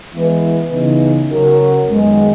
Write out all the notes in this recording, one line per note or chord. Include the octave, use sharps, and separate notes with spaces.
E3 G#3 B3 E4 B4
C#3 E3 B3 D#4
C#3 F#3 C#4 F#4 A#4
F#2 D#3 G#3 B3